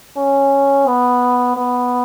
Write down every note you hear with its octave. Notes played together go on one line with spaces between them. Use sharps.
C#4
B3
B3